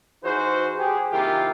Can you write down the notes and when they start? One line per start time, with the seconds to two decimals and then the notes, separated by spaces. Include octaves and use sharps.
0.24 E3 D#4 F#4 G#4 C5
0.78 G4 G#4
1.12 C3 D#3 A#3 E4 F4 G4